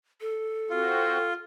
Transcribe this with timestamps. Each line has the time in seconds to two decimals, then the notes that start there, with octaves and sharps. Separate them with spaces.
0.21 A4
0.70 C4 F4 F#4